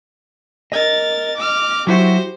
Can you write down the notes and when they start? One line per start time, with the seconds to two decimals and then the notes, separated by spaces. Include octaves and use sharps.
0.72 A#4 D#5 A6
1.37 D6 F6
1.87 F#3 E4 F#4 G4 C5